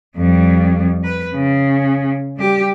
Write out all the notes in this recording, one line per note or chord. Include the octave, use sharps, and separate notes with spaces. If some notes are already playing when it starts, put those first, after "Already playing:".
F2 G3
B4
C#3
G3 G4